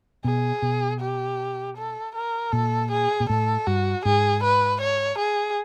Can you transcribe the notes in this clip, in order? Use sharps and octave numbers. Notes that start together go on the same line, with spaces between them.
B2 G#4
B2
G4
A4
A#4
A#2 A4
G#4
A#2
A2 A4
G2 F#4
G#2 G#4
B4
C#5
G#4